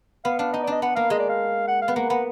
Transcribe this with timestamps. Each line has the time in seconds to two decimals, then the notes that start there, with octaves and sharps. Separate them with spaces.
0.24 B3 F5
0.39 D4 F5
0.53 D#4 D#5
0.63 D5
0.67 D4
0.72 D#5
0.82 B3 F#5
0.96 A#3 F5
1.10 G#3 D#5
1.19 D5
1.29 F5
1.68 F#5
1.82 F5
1.88 B3
1.96 A#3 F#5
2.10 B3 F#5